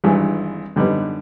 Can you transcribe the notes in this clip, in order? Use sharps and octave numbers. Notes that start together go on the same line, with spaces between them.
G#1 G2 E3
F#2 D3 G3 B3 D#4